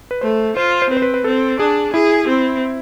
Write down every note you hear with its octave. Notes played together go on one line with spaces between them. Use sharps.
B4
A3 C5
F4 C5
C5
C4 B4
C5
B4
B4
C4 A4
D4 G#4
E4 G#4
C4